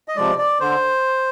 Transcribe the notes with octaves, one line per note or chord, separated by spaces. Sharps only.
D#5
C3 F3 G#3 D5
D5
D3 C5